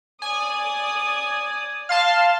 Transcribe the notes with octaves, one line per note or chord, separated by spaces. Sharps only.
D5 G#5 D#6
F5 A5 C6 F6